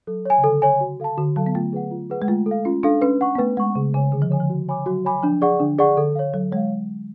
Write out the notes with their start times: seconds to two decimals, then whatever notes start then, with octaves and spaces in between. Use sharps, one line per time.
0.07 F#3 A4
0.25 C#5 G#5
0.38 C#3
0.44 D3 A4
0.62 C#5 G#5
0.81 F#4
1.00 A4 F5 A5
1.17 D3 F#4
1.36 F#3 A4 F5 A5
1.46 B3
1.55 A3 F4
1.73 G#4 B4 F#5
1.91 F4
2.10 G#4 B4 F#5
2.22 G#3
2.28 A3 F4
2.46 A4 F5
2.65 C#4 F4
2.83 D4 A4 F5
3.01 C#4 B4
3.21 F#5 C#6
3.35 B3
3.38 A3 B4
3.57 G#3 F#5 C#6
3.75 C#3 G#4
3.94 C#3 C#5 G#5
4.12 D3 G#4
4.22 F3
4.30 D3 C#5 G#5
4.40 F3
4.50 F#4
4.69 C#5 G#5 B5 D6
4.86 F#3 F#4
5.05 C#5 G#5 B5 D6
5.23 F3 D4
5.42 G#4 D5 F#5 C#6
5.60 D3 D4
5.79 G#4 D5 F#5 C#6
5.97 D3 A4
6.15 C#5 F5
6.34 F#3 A4
6.52 G#3 C#5 F5